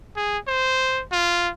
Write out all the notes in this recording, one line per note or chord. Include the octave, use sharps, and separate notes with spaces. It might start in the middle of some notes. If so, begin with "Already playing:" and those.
G#4
C5
F4